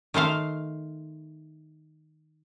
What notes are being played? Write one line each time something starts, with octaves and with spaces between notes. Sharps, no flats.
D#3 A3 C5 F5